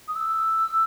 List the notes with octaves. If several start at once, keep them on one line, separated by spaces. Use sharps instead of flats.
D#6
E6